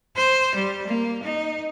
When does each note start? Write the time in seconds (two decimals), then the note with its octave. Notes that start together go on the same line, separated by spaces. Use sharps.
0.16 C5
0.55 G3
0.87 A#3
1.23 D#4